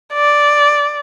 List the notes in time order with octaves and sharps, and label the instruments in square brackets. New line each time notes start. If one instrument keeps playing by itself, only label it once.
[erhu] D5